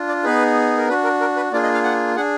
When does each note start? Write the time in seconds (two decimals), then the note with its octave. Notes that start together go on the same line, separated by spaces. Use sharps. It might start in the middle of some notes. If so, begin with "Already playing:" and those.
Already playing: D4 F4
0.08 D5
0.24 B3 D#4 G#4 B4
0.77 A#4
0.88 D4 F#4 B4
1.04 A#4
1.21 A#4
1.36 B4
1.52 A#3 D4 F4 G#4 D5
1.63 D#5
1.74 F5
1.84 F#5
2.16 D4 G#4 F#5